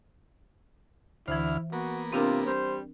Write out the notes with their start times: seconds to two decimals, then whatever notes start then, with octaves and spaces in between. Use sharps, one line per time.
1.28 D2 E3 E4 C5 F6
1.72 A#3 B3 F#4
2.12 C3 C4 D4 F4 A#4
2.46 G3 C5